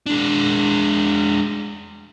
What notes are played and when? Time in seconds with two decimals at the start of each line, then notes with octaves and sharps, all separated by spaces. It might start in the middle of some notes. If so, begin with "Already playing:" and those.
0.06 G#3 D4